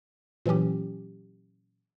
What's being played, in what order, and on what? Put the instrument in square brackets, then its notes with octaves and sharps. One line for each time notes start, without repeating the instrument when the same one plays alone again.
[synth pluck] A#2 E3 F#3 C#4 G4